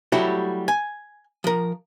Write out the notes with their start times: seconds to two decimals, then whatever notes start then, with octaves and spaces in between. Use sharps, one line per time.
0.12 F#3 G3 A3 E4 F#4 G4
0.68 G#5
1.44 F3 A#4